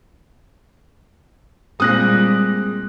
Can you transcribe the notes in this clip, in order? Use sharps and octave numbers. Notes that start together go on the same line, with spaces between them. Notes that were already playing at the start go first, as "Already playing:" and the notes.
A#2 G3 G#3 C4 D#6 F#6 A#6 F#7